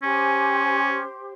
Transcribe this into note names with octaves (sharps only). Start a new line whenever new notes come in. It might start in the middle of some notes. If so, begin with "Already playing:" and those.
C#4 G4 C5 G#5